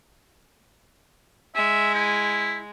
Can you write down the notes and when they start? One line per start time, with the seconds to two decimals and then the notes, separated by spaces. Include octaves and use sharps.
1.56 G#3 E5
1.95 E4